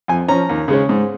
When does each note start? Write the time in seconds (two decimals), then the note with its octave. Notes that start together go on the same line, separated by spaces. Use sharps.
0.08 F2 G#5
0.28 F3 C#4 A#5
0.49 D#2
0.68 C#3 G#3 C#4
0.89 G#2